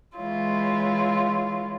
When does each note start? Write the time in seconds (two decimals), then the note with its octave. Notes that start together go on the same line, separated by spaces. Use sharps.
0.17 E3 G#3 E4 F4 C#5